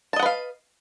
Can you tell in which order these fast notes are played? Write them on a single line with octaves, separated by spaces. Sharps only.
A5 D#5 F#5 B4 F5